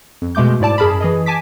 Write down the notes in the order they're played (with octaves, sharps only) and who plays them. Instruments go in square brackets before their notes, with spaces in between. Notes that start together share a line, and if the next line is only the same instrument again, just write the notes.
[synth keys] F2
B2 G#3 A3 D6 G6
G#2 E4 D5 A5 D6
F#2 G#4 A#4 A5 B5
E3 G#4 D#5
G#5 A5 D6 B6